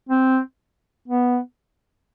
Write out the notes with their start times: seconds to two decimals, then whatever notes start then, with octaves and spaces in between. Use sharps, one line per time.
0.09 C4
1.08 B3